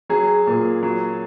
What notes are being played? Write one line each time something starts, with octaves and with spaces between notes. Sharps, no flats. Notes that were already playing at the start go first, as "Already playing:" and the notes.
F#3 G#4
A#2
F#3